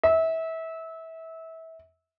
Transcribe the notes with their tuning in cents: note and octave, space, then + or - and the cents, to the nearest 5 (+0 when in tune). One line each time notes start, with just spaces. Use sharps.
E5 -25